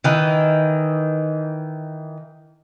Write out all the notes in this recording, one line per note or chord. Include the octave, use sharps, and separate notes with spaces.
D#3 E3